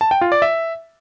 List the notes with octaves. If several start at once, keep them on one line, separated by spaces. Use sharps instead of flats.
A5
G5
F4
D5
E5